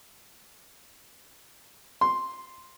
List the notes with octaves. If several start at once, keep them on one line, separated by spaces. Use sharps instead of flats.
C6